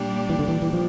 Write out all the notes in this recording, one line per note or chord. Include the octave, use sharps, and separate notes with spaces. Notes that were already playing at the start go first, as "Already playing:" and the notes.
Already playing: A#2 G3 D4 G4 D5
E3
D3
E3
E3
F3